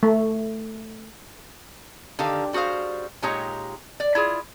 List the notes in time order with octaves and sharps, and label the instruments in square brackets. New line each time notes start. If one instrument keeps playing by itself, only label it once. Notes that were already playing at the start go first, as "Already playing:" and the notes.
[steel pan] A3
[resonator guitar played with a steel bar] D3 D#3 G4 F5
G3 F#4 G#4 C5 F5
A#2 G#3 D#4 G4 C#5 A#5
D5
E4 F4 G#4